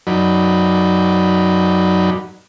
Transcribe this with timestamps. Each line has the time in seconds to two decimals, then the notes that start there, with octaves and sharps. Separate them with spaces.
0.07 F#2 F#3 D#4 D5 B5